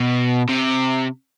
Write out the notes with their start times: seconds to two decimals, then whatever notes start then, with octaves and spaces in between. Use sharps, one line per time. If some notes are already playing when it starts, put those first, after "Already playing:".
Already playing: B2
0.49 C3